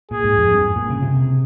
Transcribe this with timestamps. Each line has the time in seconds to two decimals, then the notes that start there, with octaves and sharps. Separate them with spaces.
0.11 A#2 G#4
0.24 G#2
0.38 F2
0.50 G2
0.76 A#2
0.90 C#3
1.03 C3